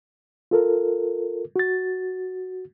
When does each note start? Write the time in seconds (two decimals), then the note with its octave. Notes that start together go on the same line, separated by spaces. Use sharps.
0.51 F4 A4 A#4
1.56 F#4 A6